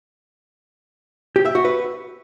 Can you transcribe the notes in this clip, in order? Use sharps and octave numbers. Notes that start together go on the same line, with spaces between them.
G4
E5
F#4
B4